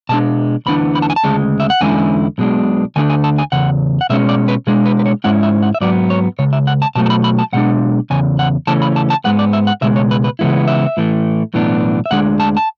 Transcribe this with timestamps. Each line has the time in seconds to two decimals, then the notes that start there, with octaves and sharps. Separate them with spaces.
0.09 B2 G#3 D4 A5
0.66 D2 C#3 E3 B3 D4 B5
0.95 B5
1.02 A5
1.10 G#5
1.16 A5
1.24 D2 C#3 G#3
1.60 E5
1.70 F#5
1.81 E2 D3 G#3 C#4 E4 G#5
2.38 B1 B2 G#3 D4
2.96 D2 D3 A3 D4 G#5
3.10 G#5
3.24 A5
3.38 G#5
3.52 E2 C#3 F#5
4.01 F#5
4.10 B2 G#3 C#4 E5
4.29 D5
4.48 B4
4.67 B2 G#3 D4 G#4
4.86 B4
4.99 B4
5.06 C#5
5.24 G#2 G#3 C#4 E4 F#5
5.43 E5
5.63 F#5
5.75 E5
5.81 G#2 F#3 B3 D5
6.10 C#5
6.39 C#2 C#3 C#5
6.53 E5
6.67 F#5
6.82 A5
6.95 B2 F#3 A3 A5
7.06 A5
7.10 B5
7.24 B5
7.39 A5
7.53 B1 B2 G#3 D4 F#5
8.10 E2 C#3 G#5
8.39 F#5
8.67 C#3 E3 A3 C#4 A5
8.82 B5
8.96 A5
9.10 A5
9.24 G#2 G#3 B3 F#5
9.39 D5
9.53 E5
9.67 F#5
9.82 C#2 B2 G#3 E5
9.96 C#5
10.11 B4
10.24 B4
10.39 C#3 E3 G#3 B3 E4
10.68 E5
10.97 A2 E3 A3
11.54 B1 A2 E3 B3 D4
12.06 E5
12.11 D2 D3 G#3 D4 F#5
12.40 A5
12.57 A5